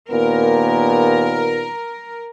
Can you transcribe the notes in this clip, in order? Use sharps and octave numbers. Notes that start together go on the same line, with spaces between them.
D#2 A#2 B3 A#4